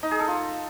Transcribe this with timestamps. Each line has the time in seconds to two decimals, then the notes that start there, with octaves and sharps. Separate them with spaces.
0.03 D#4
0.11 G#4
0.20 A4
0.28 F4